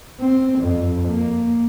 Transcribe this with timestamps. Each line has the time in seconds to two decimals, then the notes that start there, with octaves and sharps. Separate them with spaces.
0.20 C4
0.59 F2
1.09 A#3